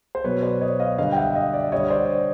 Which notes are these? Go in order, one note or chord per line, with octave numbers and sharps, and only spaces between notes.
C5
B2 F#3 B4 C#5
C5 D5
C#5 D#5
D#5 F5
D3 G3 D#5 F5
G5
E5 F#5
D#5 F5
D5 E5
D3 G3 C#5 D#5
C5 D5